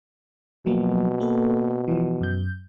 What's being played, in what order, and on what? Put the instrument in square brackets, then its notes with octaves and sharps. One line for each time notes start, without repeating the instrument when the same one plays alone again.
[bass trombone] B2 [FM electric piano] F3 F#3 A#3
[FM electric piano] A#3 A4 B4
E3 F3
F#2 G6